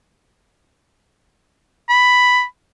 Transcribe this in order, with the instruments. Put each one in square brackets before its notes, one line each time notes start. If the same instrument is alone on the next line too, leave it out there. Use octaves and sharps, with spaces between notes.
[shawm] B5